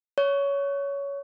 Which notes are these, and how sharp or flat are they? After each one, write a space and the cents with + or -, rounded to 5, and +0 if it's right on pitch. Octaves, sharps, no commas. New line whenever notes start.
C#5 +15